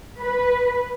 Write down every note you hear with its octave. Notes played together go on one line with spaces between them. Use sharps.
B4